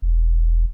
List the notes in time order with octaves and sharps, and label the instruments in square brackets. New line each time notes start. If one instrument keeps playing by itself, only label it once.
[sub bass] E1